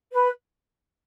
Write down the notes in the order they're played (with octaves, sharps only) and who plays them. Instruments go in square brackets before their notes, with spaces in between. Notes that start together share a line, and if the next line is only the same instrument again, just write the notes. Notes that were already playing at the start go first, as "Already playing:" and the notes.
[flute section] B4